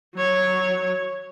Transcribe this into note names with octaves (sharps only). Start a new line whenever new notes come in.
F#3 C#5